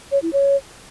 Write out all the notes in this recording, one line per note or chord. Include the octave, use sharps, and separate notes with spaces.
C#5
E4
C#5